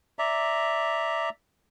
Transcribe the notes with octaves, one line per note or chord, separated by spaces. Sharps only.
D5 E5 A#5